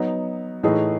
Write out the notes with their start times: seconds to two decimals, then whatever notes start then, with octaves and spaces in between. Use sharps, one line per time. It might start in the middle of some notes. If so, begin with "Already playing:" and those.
Already playing: F#3 B3 D#4
0.63 A2 E3 A3 D#4 G#4